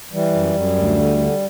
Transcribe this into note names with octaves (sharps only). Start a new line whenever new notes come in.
E3 G3
F#2
F#2
D2
D3
D3